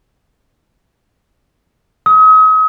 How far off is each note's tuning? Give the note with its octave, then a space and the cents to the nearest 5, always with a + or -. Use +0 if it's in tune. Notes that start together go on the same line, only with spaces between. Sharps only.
D#6 +40